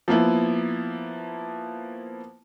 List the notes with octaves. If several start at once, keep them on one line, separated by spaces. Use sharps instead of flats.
F3 A#3 B3 E4